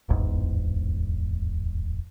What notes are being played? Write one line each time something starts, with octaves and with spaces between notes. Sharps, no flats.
D1 G1 E2 G#2